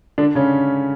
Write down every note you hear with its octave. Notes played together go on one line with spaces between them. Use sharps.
D3 D4
C#3 C#4